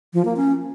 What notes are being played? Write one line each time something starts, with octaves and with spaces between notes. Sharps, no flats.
F3
A#3
C#4